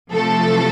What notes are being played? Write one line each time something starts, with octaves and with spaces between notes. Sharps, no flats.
C3 F3 A3 A4